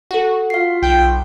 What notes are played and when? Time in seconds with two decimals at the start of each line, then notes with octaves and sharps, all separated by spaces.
0.11 F#4 A4 F#5
0.50 F4 F5 C7
0.82 B1 G5